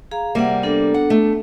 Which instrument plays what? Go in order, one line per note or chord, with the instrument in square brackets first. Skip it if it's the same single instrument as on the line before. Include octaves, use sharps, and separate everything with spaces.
[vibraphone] G#4 F5 A#5
[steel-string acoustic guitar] C3 G3 A#3 [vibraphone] E5 F#5
[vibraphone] B3 D4 A4
[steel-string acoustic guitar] F#5
A3